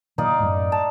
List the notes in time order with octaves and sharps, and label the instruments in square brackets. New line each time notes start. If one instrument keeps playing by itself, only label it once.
[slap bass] A#2 D#3 F#3 [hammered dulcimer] D#4 D5 F5
[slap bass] F#2 A2
[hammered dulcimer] A5